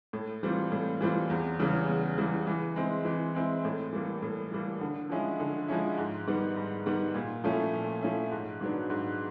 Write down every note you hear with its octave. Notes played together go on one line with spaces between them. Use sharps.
A2
E3 G3 C4 F4
A2
E3 G3 C4 F4
E2
C#3 E3 G3
E2
C#3 E3 G3
E3
G#3 C4 E4
E3
G#3 C4 E4
A2
E3 G3 A#3
A2
E3 G3 A#3
D3
F3 G#3 C#4 E4
D3
F3 G#3 C#4 E4
G#2
D#3 G3 B3
G#2
D#3 G3 B3
A#2
F3 A3 C#4 E4
A#2
F3 A3 C#4 E4
G#2
D#3 F#3 B3 D4
G#2